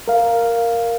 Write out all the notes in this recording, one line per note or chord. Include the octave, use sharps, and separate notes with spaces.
A#4 F5